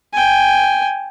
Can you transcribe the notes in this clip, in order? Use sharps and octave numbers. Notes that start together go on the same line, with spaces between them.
G5 G#5